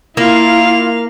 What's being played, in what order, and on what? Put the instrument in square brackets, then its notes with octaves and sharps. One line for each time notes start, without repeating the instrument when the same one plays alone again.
[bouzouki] A#3 [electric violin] E4 [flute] F4 [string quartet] F5